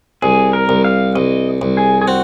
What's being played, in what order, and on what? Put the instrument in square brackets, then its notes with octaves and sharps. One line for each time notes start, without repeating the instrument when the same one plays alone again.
[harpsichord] C2 [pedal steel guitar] G#4
[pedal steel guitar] A#4
[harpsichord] C2
[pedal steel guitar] F5
[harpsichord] C2 [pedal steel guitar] D#5
[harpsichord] C2
[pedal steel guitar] G#4
G#4
[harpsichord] C4 [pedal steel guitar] F#4